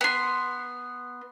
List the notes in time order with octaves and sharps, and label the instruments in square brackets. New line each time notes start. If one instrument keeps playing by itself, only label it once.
[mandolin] B3 C6